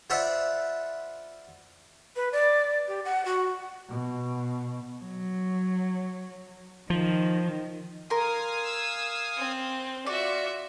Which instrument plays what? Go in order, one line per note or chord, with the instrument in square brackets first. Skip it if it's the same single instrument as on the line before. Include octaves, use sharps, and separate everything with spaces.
[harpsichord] F4 C5 D5 E5 F#5 B5
[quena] B4
D5
G4
F#5
F#4
[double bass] B2
[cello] F#3
[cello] D#3 [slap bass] F3
[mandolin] A#4 C6 [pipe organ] F5 G#5 D#6
[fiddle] E6
C4
[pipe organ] F4 [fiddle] F#4 E5 [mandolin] D5